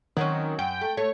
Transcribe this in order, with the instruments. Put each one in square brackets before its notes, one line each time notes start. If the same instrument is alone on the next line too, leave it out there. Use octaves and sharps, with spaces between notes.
[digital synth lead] D#3 [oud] F#3 C4 C#4
[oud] F#2 [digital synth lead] G5
[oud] A3
[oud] A3 [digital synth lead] C#5